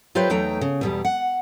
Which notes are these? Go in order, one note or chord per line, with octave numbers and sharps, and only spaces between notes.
F#3 F4 G4 B4 C5 E5
E2 F#3 A3 D#4 G5 A#5
C#3
E2 B2 G3
F#5